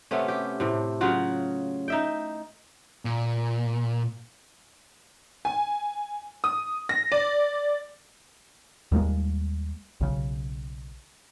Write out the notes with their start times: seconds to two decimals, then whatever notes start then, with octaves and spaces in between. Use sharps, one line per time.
0.11 C3 A3 B3 C#4
0.28 G4
0.60 A2 C3
1.01 C#3 F#3 F4 F#4
1.88 D#4 E5 G5
3.05 A#2
5.45 G#5
6.44 D#6
6.89 A#6
7.12 D5
8.92 D#2 G3 G#3 A#3
10.01 B1 C#3